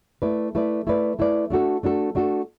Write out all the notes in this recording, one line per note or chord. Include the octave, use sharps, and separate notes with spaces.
A3 E4 B4 D5
A3 E4 B4 D5
A3 E4 B4 D5
A3 E4 B4 D5
A3 D4 F#4 A4
A3 D4 F#4 A4
A3 D4 F#4 A4